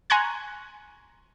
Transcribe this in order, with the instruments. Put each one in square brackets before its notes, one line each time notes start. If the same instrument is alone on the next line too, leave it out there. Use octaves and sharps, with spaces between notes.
[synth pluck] G#5 A#5 C6 C#6 F#6 G#6